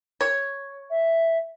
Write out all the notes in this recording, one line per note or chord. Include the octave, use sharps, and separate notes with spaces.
C#5
E5